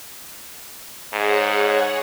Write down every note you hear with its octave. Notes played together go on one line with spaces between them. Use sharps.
G#2 G#4 C#5 F#5